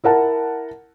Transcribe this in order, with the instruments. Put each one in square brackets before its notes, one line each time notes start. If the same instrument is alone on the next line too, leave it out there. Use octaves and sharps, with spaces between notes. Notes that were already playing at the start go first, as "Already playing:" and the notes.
[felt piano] E4 A#4 F#5 A5